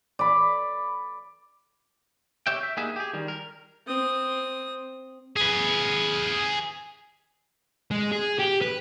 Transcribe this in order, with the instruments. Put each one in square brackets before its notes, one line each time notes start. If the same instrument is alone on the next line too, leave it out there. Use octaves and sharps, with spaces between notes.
[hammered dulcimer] D5 B5
[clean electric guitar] G4 C#5 E5 G5
E5
A#3 B3 D#4 G4 G#4 E5
G4 G#4
D#3 G3
A#4
[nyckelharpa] C4 D#6
[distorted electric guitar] G#4 B4
G#3
G#4
G4
B4